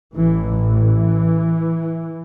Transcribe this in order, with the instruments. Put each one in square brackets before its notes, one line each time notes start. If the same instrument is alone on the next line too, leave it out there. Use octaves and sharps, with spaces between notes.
[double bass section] A1 A2 E3
E3